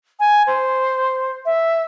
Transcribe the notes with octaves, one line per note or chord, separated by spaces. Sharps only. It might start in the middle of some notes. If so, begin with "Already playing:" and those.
G#5
C5
E5